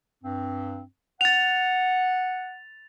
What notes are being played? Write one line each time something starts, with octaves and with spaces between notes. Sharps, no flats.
G2 C4
F#5 A6 F7